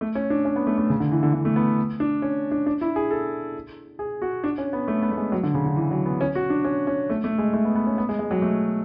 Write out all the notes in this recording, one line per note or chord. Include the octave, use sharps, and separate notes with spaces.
A3
C#4
D4
C#4
B3
A3
A3
C#3
D3
E3
D3
D3
A3
B3
D4
C#4
D4
D4
E4
G#4
A4
G#4
F#4
D4
C#4
B3
A3
B3
A3
G#3
F#3
D3
C#3
D3
E3
F#3
B3
C#4
F#4
D4
C#4
C#4
A3
A3
G#3
A3
B3
B3
C#4
B3
G#3
G#3
F#3
A3